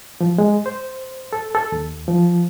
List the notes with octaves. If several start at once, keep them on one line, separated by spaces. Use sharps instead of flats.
F3
G#3
C5
A4
A4
D#2
F3